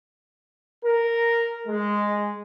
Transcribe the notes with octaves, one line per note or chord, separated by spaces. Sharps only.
A#4
G#3